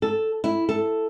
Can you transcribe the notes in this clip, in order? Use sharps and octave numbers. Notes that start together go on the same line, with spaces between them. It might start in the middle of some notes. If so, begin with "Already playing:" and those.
A4
E4
A4